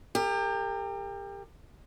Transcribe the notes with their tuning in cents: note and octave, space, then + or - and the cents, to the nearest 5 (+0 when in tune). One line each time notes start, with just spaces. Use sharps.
G4 +30 A#4 -35